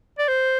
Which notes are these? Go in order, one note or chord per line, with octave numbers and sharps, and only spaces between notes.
D5
C5